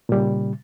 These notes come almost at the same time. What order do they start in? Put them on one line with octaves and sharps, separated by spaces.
A#2 G3 C#3